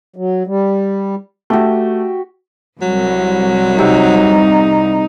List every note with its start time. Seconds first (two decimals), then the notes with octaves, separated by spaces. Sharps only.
0.16 F#3
0.47 G3
1.50 A3 F#4 G4
2.81 C2 F#3
3.79 C3 D#4